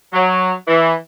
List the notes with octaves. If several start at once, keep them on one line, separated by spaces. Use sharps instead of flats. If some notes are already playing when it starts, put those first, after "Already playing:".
F#3
E3